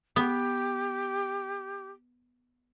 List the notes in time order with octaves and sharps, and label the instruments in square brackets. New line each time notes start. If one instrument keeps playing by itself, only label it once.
[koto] B3 [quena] G4